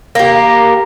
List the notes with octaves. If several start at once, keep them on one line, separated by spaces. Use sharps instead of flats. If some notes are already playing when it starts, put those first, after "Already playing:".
A#3 G4